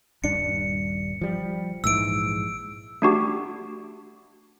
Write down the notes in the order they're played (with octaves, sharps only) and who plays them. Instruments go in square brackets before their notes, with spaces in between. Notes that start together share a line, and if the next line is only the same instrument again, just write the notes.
[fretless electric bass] D#1 G2 D4 [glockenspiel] C#7
[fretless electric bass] F3 G3
[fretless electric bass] A#1 G#2 E3 [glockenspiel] E6 D7
[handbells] A3 D4 F#4 G4